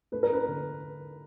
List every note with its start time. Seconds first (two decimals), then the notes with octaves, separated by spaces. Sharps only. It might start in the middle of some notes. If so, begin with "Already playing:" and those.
0.12 A3 B4
0.23 A#4
0.30 C#4 B4
0.48 D3